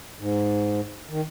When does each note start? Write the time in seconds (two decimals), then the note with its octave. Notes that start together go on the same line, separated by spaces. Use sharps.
0.19 G#2
1.09 D#3